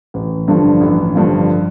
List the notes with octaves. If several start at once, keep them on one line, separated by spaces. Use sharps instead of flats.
A1
G2 D3 F3
A1
G2 D3 F3